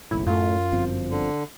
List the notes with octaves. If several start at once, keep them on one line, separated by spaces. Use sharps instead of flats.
F#1 B1 A2 E4
F#2 A2 A3 F4
G1 F3 C4
D3